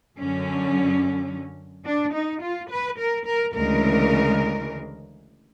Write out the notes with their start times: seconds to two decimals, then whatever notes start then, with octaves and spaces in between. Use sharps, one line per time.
0.17 F#2 D3 F#3 C#4
1.86 D4
2.14 D#4
2.42 F4
2.70 B4
2.99 A#4
3.26 A#4
3.54 D2 C#3 E3 G#3 A#4